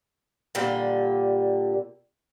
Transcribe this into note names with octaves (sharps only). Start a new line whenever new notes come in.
A#2 D3 G3 G4